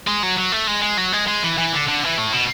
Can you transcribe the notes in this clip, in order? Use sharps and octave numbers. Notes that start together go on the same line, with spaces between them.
G#3
F#3
F#3
A3
G#3
G#3
F#3
G#3
G#3
E3
E3
D3
D3
E3
A2
B2